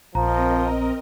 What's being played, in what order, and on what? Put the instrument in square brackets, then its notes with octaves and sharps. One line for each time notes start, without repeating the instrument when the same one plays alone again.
[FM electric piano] A#1 [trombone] F3 [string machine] C4 A#4 D#5 [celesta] A#5